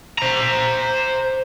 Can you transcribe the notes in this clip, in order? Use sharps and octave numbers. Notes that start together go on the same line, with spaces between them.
C5 A#5